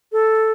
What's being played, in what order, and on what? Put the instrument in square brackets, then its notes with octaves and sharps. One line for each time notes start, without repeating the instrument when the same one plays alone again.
[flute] A4